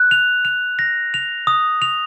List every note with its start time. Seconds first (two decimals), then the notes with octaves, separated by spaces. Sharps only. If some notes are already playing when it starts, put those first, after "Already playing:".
Already playing: F#6
0.11 F7
0.45 F7
0.79 A#6
1.14 F7
1.47 D#6
1.82 F7